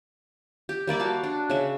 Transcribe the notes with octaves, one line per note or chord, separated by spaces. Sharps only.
G4
G3 A#3 D5 E5
F#4 F5 A5
D4
C#3 E5